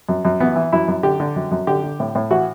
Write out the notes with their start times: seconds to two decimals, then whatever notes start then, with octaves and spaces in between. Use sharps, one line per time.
0.09 F#2
0.25 F#2
0.40 E3 B3
0.56 E3
0.73 F#2 E4
0.88 F#2
1.03 D3 G4
1.20 D3
1.36 F#2
1.51 F#2
1.67 D3 G4
1.84 D3
2.00 A2
2.15 A2
2.31 E3 F#4